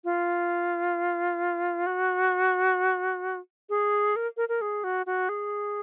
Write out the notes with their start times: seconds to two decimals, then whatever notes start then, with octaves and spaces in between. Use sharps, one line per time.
0.04 F4
1.86 F#4
3.69 G#4
4.16 A#4
4.37 A#4
4.49 A#4
4.61 G#4
4.84 F#4
5.06 F#4
5.29 G#4